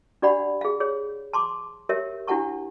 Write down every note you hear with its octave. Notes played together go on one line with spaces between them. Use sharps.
D4 G4 D5 F#5 B5
G#4 F5
G#4 C#5
A5 C6 D6
G4 A#4 C#5 E5
D4 E4 G4 F#5 A5 C#6